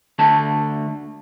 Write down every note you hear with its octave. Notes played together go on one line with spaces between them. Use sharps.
D2 D3 A3 A5